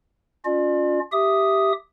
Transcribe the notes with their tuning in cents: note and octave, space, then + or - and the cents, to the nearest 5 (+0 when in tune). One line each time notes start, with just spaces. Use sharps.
C#4 +30 F4 +25 D5 +40
G4 -5 E5 +0 D#6 +0